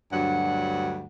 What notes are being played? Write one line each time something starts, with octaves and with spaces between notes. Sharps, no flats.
D2 G2 F#3 F#5